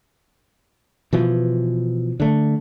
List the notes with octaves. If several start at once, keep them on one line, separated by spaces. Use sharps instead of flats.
B2 E3 F3
D3 A3